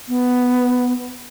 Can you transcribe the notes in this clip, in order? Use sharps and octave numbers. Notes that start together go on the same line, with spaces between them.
B3